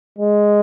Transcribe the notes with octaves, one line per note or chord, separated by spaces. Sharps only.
G#3